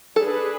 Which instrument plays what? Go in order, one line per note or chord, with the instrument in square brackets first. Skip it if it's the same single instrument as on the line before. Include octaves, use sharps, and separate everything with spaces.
[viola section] D4 G#4 B4 [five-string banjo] A4